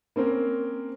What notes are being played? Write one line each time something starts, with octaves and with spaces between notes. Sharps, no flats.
A#3 C4 C#4 A#4